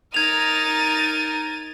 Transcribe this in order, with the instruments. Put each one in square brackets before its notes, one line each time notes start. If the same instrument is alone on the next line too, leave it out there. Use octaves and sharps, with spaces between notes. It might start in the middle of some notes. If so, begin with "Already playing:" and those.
[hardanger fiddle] D#4 A#4 [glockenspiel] G#6 F7 [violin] A6 D#7